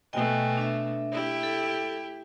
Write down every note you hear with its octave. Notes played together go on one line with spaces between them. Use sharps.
B2 A3 D#5 G5 G#5
D4 E5
E4 G4
A4